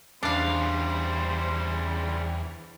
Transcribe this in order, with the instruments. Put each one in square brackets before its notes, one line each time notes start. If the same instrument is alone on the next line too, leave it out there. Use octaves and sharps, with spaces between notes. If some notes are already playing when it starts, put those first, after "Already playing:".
[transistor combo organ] E2 [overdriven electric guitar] C#3 G3 [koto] D4 F5 [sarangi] C5